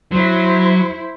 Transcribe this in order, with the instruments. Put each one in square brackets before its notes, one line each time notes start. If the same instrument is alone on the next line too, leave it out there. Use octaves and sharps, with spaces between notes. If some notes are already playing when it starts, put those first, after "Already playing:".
[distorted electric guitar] F#3 [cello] E4 C5